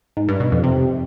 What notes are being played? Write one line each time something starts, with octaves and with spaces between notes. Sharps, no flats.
G#2
G2
B2
F2
C3